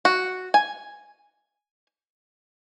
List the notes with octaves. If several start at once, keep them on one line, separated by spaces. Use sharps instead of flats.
F#4
G#5